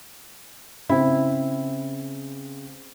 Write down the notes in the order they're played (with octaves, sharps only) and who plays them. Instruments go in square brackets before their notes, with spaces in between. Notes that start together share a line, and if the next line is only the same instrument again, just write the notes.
[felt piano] C#3 C4 [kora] E4